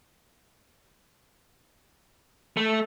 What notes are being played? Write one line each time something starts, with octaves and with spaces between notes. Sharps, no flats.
A3